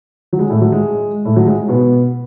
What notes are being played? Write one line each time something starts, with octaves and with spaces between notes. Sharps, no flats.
F#3
G#3
A2 A3
F#3
G#3
A2 A3
F#3
G#3
B2 B3